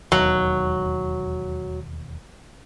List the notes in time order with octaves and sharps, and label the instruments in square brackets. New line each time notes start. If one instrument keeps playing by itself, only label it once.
[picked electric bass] E1 D#2 [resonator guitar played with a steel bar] F#3